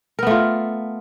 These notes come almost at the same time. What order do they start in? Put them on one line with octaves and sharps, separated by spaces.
A#4 B3 A3 F4